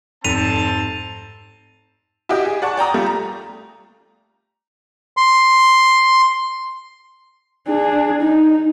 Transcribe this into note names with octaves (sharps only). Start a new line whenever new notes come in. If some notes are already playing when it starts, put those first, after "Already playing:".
F1 G#2 C4 D#4 A5 B6 D#7 F7
E4 F#4 G4 D#5
G#4
D5 F#5 A5 C#6
D5 G5 A#5 D#6
G3 A3 F4
A#5
C6
D4 G#4
D#4